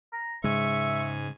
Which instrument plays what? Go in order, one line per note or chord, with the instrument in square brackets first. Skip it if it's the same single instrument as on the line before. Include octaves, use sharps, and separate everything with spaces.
[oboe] A#5
[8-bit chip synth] G#2 G#5 [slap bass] C#3 G#3 [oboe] E5 [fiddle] C#6